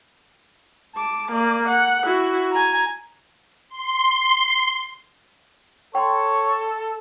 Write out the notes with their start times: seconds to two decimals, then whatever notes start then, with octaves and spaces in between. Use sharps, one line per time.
0.96 A5 D6
1.32 A#3 D5
1.68 F#5
2.04 E4 F#4
2.52 G#5 A#5
3.69 C6
5.95 A4 C#5 G5 C6